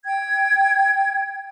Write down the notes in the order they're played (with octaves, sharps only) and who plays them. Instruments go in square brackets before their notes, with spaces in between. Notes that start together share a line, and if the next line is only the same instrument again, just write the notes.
[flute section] G5 G#6